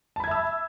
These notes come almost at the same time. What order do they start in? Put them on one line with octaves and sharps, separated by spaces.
A5 B5 G#6 E5 E6